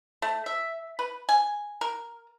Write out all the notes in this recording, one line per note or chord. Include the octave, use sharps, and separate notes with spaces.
A3
E5
B4
G#5
A#4